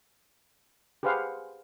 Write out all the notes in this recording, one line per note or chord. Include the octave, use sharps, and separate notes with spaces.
G4 G#4 B4 C5 F5 F#5